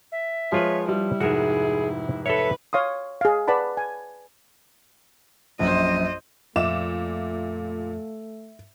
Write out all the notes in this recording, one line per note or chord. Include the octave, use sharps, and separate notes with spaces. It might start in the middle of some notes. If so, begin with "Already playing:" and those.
E5
F3 G#3 F4 B4 C#5
G3 E4
F1 G#2 F#4 G#4 A#4 E5
A4 B4 C#5 E5
C#5 F5 C6 D#6
G#4 F5
B4 D5 F#5 A5 B5
G#5
A#1 F#2 C5 D#5
F2 A#2 A3 E5 D6 E7